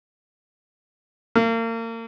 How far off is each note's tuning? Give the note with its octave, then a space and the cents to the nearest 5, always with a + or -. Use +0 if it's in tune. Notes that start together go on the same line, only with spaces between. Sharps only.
A#3 -35